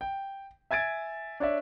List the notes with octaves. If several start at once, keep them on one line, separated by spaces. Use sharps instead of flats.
G5
E5 G#5 G#6 A6 D7
D4 C#5 D5 E5